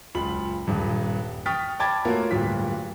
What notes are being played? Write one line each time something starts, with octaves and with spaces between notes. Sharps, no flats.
F#1 C#2 F4 B5 F#7
D#1 G2
G5 C#6 D#6 F6 A6 B6
G5 A5 B5 D6 G#6 A6
A3 A#3 F4 F#4 A#4 C#5
D1 G2 F4 B6